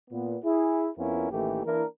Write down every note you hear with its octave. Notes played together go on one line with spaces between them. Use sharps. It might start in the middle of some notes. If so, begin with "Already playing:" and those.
A#2 B3
E4 G#4
F2 B3 C#4 E4 F4 A#4
A1 D#3 E3 A3 A#3 G4
E3 A#3 D4 E4 A#4